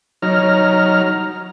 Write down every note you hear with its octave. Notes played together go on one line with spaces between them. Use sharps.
F#3 D#4 C#5 A#5 F6